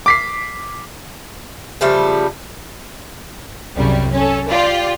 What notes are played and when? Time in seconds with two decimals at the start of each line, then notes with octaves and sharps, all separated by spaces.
0.06 D6 B6 C7
1.81 C#3 F3 G3 A3
3.76 C2 F#2 C#3 G3
4.13 C#4 A4
4.48 F4 G4 D5